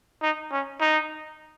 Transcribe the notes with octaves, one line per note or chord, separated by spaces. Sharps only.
D#4
C#4
D#4